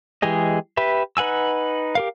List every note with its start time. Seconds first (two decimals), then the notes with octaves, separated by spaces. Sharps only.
0.22 E3 G#3 G4 G#4 D#5
0.77 G4 B4 E5
1.17 D#4 B4 F#5 G#5 E6
1.95 G4 A#4 F5